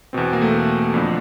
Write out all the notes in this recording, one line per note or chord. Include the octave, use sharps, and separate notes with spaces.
E2 B2 C4
A#3
A3
A3
F2 D3 F3